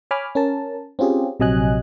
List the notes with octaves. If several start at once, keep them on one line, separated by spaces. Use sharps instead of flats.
C#5 G#5 B5 D6 F6
C#4 A#4 A5
C4 C#4 F4 G4 G#4
A#1 C3 F#3 D#5 G#5 F#6